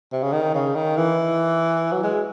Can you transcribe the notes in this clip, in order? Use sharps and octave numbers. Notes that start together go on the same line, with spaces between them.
C3
C#3
D#3
C#3
D#3
E3
F#3
G#3